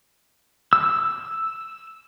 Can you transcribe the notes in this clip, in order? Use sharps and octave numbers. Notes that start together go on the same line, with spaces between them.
E6